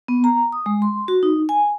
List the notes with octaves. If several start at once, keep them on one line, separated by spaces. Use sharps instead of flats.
B3
A#5
D#6
G#3
C6
F#4
D#4
G#5